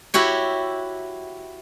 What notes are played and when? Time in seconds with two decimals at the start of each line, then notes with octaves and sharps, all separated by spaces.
0.14 E4 F#4 G4 C#5